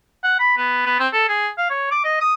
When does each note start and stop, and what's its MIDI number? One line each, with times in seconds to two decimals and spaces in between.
0.24 0.36 78
0.39 0.54 83
0.57 0.82 59
0.86 0.97 59
0.99 1.08 60
1.13 1.25 69
1.29 1.49 68
1.58 1.69 77
1.70 1.91 73
1.91 2.02 86
2.04 2.19 75
2.21 2.34 87